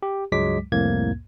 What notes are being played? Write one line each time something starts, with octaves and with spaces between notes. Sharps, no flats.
G4
C#2 G2 F#3 G#3 D6 B6
C2 F2 A2 A#3 G#6